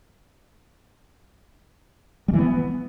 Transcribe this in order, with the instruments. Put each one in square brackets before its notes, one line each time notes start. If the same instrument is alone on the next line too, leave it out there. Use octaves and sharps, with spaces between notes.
[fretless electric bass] G3
E3
B3